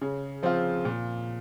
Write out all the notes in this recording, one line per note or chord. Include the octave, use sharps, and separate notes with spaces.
C#3
F3 C4 F4
A#2